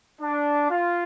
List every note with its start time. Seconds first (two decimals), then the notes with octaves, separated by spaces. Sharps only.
0.21 D4
0.70 F4